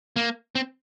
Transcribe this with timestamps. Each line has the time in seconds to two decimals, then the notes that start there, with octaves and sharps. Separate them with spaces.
0.16 A#3
0.55 C4